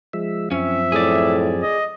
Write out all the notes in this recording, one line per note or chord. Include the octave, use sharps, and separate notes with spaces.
F3 G#3 E5
F#2 F3 C4 C#4 E5
A2 G#4 D5
D#5